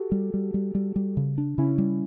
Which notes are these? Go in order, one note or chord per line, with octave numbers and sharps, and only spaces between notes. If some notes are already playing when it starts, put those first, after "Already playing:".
Already playing: F#4 G4 A4
G3
G3
G3
G3
G3
C#3
D4
C#3 C#4 E4
G3